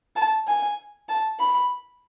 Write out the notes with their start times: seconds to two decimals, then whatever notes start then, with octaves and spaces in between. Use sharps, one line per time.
0.16 A5
0.47 G#5
1.09 A5
1.40 B5